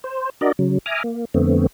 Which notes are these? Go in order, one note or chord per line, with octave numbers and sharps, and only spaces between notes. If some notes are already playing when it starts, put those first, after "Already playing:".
C5
D4 F#4 A#4 D5 D#5
C#3 F#3
E5 G#5 A#5 D6 D#6 F6
A#3
F2 D3 A3 B3 C4